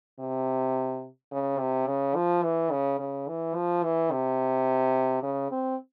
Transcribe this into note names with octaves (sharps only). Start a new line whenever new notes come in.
C3
C#3
C3
C#3
F3
E3
C#3
C#3
E3
F3
E3
C3
C#3
C4